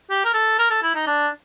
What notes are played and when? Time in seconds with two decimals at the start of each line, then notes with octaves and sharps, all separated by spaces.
0.10 G4
0.25 A#4
0.34 A4
0.59 A#4
0.70 A4
0.82 E4
0.95 D#4
1.07 D4